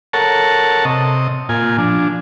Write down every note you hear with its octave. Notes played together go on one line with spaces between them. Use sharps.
A4 A#4 C#5 F#5 A5
C3 D#5
A#2 F4 G#5
F3 D4